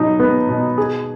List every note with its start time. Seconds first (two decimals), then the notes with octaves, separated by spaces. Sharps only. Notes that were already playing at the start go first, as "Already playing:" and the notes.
Already playing: B2 F#3 D#4
0.20 B3
0.49 B2
0.78 G#4